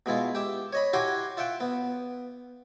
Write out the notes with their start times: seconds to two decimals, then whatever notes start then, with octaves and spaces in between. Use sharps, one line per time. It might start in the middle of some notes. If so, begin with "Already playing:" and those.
0.06 B2 G#3 E4 F4
0.35 G4 E5
0.73 C#5 D#5 B5
0.93 E4 F#4 G4 F#5 G#5 C6
1.37 F4 E5 F#5 G5
1.60 B3